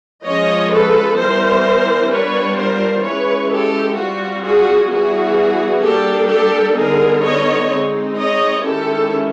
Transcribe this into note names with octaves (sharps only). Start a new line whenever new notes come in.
F3 G#3 C#4 C#5 D#5
A4 B4
E3 G3 B3 A#4 C5
G3 B3 D4 F4 B4 C#5
A#4 C5
E3 G#3 C#4 B4 C#5
G4 A4
G3 C4 F4 F#4
F#4 G#4
E3 G3 B3 F#4 G#4
G3 A#3 D4 G4 A4
G4 A4
D3 G3 B3 D#4 G#4 A#4
C#5 D#5
G#3 C4 D#4
C#5 D#5
D#3 G#3 C#4 E4 G4 A4